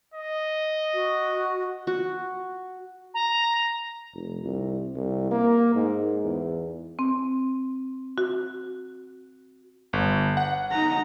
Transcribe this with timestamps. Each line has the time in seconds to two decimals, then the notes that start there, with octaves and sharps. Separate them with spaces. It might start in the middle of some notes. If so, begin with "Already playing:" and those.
0.14 D#5
0.94 F#4
1.87 F#4
3.14 A#5
4.14 F1
4.44 C2
4.96 C2
5.31 A#3
5.75 G#2
6.24 E2
6.99 C4
8.18 F#4
9.93 G1
10.37 F#5
10.71 D#4 A#5